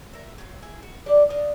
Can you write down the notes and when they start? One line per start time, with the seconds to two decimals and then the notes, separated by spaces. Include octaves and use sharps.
0.13 A#4 E5
0.38 F#3 C4
0.62 E4 G#4
0.83 F#4
1.06 G3 D4 G4 D5
1.30 D4 D5 D#5 F5